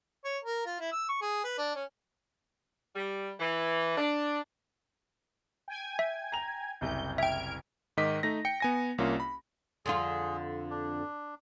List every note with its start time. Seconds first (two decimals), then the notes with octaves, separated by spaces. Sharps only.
0.25 C#5
0.44 A#4
0.66 F4
0.80 E4
0.92 E6
1.09 C#6
1.21 G#4
1.44 B4
1.58 D4
1.75 C#4
2.96 G3
3.40 E3
3.97 D4
5.68 G5 G#5 G#6
5.99 E5
6.32 A#5 F7
6.81 F#1 C2 G6
7.18 E5 G5 F6 G#6 D7
7.97 G#2 D#3 D#5 D6 B6
8.23 A3 D#4 A#6
8.45 G5 C#7
8.60 B3 G#5 A#6
8.98 C2 A#3 C#4 F4
9.20 B5
9.86 F2 D3 F4 G#4
10.71 D4